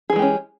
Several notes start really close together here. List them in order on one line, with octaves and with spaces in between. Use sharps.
G#4 E3 G#3 G4 C#4